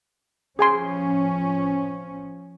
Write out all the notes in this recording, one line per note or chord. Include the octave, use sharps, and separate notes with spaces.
F3 C#4 G#4 G#5 C6